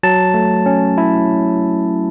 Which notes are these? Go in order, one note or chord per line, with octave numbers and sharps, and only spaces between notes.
F#3 A5
A3
C#4
E4